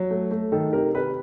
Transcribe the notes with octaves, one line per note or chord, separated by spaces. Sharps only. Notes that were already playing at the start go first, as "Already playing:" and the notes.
Already playing: F#3
A3
A3
D#3 A4
C3 A#4
C3 B4